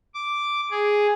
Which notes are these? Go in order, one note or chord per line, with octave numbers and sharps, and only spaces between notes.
D6
G#4